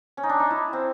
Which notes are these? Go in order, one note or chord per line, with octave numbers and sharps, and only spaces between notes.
C#4
D#4
D4
D#4
E4
C4